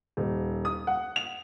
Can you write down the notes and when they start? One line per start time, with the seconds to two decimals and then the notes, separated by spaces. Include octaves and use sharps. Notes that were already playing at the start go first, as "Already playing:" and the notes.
0.17 D#1
0.65 D#6
0.87 F#5
1.16 F7